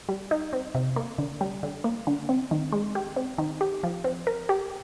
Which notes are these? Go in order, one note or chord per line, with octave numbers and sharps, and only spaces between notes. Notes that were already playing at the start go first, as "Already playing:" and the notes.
G3
D#4
C4
C3
A#3
D3
G3
D3
A#3
D3
C4
D#3
G#3
G4
C4
D#3
G4
F3
C4
A#4
G4